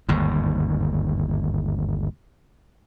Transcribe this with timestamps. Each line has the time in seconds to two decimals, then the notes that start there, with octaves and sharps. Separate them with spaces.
0.09 G1 D#2 G#2